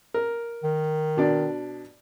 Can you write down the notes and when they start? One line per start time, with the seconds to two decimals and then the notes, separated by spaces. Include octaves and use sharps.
0.14 A#4
0.64 D#3
1.17 B2 D4 D5